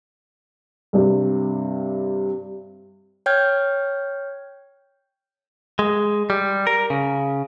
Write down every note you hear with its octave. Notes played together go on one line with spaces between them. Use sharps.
G2 C3
C#5 G5 F6 G6 G#6
G#3
G3
A#4
C#3